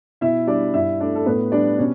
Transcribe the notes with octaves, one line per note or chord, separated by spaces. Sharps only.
B2 E4 E5
G3 D4 D5
G2 E4 E5
A3 D4 D5
A4
A2 B3 B4
G3 D4 D5
B2 C#4 C#5